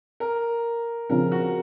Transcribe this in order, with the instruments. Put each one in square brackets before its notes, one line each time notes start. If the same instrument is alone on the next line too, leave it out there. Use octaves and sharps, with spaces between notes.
[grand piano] A#4
[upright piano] C#3 F3 C4 [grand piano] A#4
[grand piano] F#4